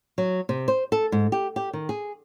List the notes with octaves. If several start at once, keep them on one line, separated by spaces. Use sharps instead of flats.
F#3
C3
C5
A4
G#2
G4
G4
D#3
G#4